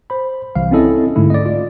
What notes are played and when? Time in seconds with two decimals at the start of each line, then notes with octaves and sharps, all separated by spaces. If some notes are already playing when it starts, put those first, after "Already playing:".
0.10 C5 B5
0.55 C2 E3 F5
0.71 C4 C#4 E4 A4 D#5
1.16 G#2 D3 A3 E4
1.30 D5 D#5
1.46 F4